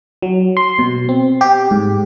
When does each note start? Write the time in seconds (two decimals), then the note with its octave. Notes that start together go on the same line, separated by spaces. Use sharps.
0.22 F#3
0.57 C6
0.79 B2
1.09 C4
1.41 G4
1.71 G#2